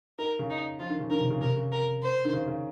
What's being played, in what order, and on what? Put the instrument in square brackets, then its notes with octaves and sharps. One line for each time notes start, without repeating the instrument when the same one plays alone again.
[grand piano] D#4 [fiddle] A#4
[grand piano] C#3
[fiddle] D#4
[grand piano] F3 [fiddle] F4
[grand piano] D#3
C#3
[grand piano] D#3 [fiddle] A#4
[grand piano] C3
C#3
[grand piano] C3 [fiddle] A#4
[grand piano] C#3
[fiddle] A#4
C5
[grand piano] D#3
C#3
C#3